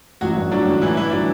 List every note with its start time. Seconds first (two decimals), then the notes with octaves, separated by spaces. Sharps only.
0.21 A1 F#3 F#4
0.37 G2
0.51 D3 F#3 D4
0.66 A1
0.82 A1 E3 E4
0.96 G2 E3 E4
1.11 D3 F#3 D4